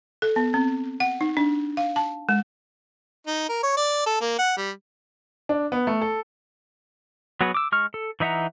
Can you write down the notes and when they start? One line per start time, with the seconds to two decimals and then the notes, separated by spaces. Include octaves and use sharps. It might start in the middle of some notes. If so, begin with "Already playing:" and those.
0.22 A4
0.36 B3
0.54 C4
1.00 F#5
1.21 D#4
1.37 D4
1.77 F5
1.96 A5
2.29 G#3
3.27 D#4
3.49 A#4
3.63 C#5
3.77 D5
4.06 A4
4.21 A#3
4.39 F#5
4.57 G3
5.49 D4
5.72 B3
5.87 A3
6.02 A4
7.41 F#3 B3 F#4 G#4 B4
7.54 D6 E6
7.72 G#3 C#6 F6
7.94 A4
8.20 E3 D#4 E5 F#5 A#5